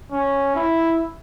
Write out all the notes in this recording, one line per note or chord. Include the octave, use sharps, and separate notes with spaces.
C#4
E4